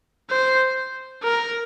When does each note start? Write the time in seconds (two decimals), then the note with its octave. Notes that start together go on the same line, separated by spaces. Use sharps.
0.30 C5
1.24 A#4